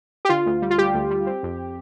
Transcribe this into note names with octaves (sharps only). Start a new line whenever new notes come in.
G4
D3 F4
D2
G3
F4
G3 G4
D2
G3
C4
F2